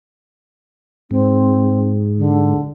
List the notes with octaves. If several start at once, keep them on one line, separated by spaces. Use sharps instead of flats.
G#2 C4
D3